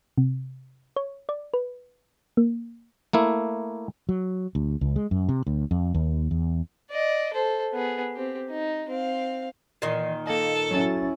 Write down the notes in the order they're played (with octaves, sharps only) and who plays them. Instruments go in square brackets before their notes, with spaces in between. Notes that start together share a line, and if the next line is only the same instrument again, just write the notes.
[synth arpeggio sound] C3
C#5
D5
B4
A#3
[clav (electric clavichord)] A3 A#3 E4
[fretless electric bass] F#3
D2
C#2
G#3
F#2
C3
D2
F2
D#2
E2
[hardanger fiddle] D5 D#5
A4 C5
B3 G#4
C4 G4
D#4
C4 F5
[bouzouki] A#2 D#3 [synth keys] E3 D#5 C7
[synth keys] A#3 D#5 [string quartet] A4
[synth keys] F#3 F#4 A6 [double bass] C#4 E4